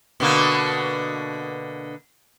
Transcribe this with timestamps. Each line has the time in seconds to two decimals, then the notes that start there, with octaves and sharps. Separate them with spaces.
0.20 B2 D3 A#3